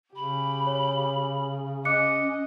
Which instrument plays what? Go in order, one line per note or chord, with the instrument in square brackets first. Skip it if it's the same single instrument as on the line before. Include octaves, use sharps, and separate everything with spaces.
[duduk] C#3 [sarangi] G4 [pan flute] B5
[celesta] C#5
[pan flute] C#4 [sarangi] D#5 [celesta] D6 F#6 C#7